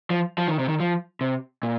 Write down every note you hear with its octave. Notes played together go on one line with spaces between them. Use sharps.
F3
F3
D#3
C3
D#3
F3
C3
A#2